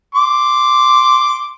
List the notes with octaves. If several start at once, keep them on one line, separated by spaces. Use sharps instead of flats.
C6 D6